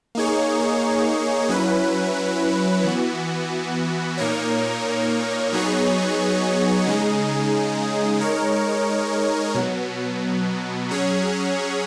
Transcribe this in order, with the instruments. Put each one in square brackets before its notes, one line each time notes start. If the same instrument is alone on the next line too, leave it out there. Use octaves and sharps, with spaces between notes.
[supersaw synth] A#3 D#4 G#4 C#5
F#3 C#4 E4 B4
E3 B3 F#4
A#2 A#3 D#4 A#4 C#5
F#3 B3 D#4 G#4 C#5
C#3 G#3 D#4 G#4
G#3 D#4 A#4 C#5
B2 F#3 B3
F#3 C#4 G#4 C#5